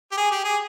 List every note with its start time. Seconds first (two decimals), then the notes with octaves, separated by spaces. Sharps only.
0.12 G4
0.17 G#4
0.31 G4
0.45 G#4